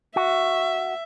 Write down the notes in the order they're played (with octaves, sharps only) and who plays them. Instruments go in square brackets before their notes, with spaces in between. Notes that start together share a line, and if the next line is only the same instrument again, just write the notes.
[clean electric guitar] F#4 [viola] E5